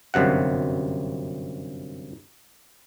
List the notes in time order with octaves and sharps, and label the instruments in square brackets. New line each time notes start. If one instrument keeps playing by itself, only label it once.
[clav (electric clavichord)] G1 F#2 C3 F#5